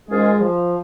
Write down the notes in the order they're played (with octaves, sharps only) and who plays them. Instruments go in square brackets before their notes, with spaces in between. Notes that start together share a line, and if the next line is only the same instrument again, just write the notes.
[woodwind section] G#2 D#3 C#4 F4 G#4 [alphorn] G#3
[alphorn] F3